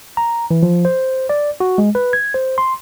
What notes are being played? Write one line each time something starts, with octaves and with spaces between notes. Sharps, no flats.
A#5
E3
F3
C5
D5
F#4
G#3
B4
G#6
C5
C6